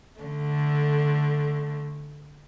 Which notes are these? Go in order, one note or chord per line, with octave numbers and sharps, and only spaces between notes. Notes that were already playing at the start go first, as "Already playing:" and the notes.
D3 A3